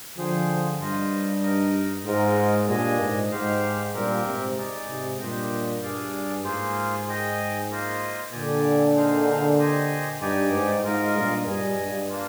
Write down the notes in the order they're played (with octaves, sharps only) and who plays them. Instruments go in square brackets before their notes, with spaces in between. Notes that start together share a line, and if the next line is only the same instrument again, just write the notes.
[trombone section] D3 F3 [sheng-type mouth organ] G#4 C5 G5
[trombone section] G2 [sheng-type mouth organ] F4 C5 D#5
[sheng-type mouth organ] D#4 A#4 D#5
[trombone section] G#2 [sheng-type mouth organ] F4 A#4 D#5
[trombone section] G2 A#2 [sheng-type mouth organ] D4 G#4 D#5 G#5
[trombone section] G#2
[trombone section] G#2 [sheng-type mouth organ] G4 C5 F5
[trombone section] G2 A#2 [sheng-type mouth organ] C4 G4 A#4
[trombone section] G#2 C3
[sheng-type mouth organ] D#4 G#4 D5
[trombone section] G#2 C3
[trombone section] G2 A#2 [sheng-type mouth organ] D4 G4 C5 D#5 G5
[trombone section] G2 [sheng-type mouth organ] D4 G#4 D5 F5
[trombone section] G#2 [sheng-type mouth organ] A#3 F4 G#4 C5
[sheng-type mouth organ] G#4 D#5 G5
A#3 F4 C5 D#5
[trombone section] A#2 D3 [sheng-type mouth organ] G4 D5 G#5
[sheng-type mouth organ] D#4 G#4 C5 F5
G4 C5 D#5 G#5
[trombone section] G2 [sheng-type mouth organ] D#4 G4 D5 G#5
[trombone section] G#2
[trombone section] G#2 [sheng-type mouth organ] F4 A#4 D#5
[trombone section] G2 A#2
[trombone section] G2 [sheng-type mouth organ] G#4 D#5 G#5
[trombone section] G2
[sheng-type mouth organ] A#3 D4 F4